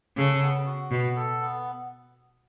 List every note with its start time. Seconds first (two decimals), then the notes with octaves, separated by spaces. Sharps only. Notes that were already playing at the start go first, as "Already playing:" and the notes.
0.17 C#3 A4
0.42 B3
0.66 F#4
0.91 B2 B3
1.16 A4
1.41 B3